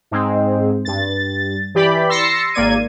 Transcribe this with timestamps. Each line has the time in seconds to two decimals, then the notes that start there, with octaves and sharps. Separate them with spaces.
0.11 G#2 G#3 C4
0.85 G2 A6
1.74 E3 G4 D5 B5
2.09 C6 E6 A6 A#6 C7 C#7
2.54 G#1 A#3 D5 G#6 D#7